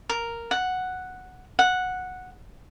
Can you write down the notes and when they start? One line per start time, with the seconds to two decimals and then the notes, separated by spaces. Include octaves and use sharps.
0.09 A#4
0.51 F#5
1.59 F#5